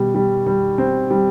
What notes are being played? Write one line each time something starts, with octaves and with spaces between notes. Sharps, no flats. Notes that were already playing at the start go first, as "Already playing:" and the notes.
Already playing: B2 G3
G3
G3
C4
G3